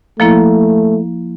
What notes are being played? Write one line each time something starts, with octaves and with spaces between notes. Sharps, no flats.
F3 A3 A#3 E4